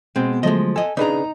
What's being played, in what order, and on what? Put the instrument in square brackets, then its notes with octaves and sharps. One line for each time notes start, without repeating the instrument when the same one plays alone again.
[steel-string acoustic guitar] B2 G#3 [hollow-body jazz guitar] C4
[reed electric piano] D3 F#3 A3 [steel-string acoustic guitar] F3 [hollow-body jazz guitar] G#3 D#5
[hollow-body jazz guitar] A4 D#5 [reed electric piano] G#5
[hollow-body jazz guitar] C#3 D4 G#4 [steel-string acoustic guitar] D#4 A#5 [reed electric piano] B4 D5